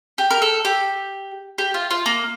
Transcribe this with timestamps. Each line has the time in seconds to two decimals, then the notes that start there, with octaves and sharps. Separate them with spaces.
0.18 G4
0.30 A#4
0.42 A4
0.65 G4
1.58 G4
1.74 F4
1.91 F4
2.06 A#3